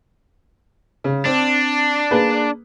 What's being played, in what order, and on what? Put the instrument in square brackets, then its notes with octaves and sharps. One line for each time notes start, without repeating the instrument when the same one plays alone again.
[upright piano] C#3
[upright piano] C4 [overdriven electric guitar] D4
[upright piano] A#3 G#4 B4